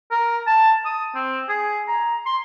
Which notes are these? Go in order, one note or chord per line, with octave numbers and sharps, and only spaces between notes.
A#4
A5
D#6
C4
G#4
A#5
C6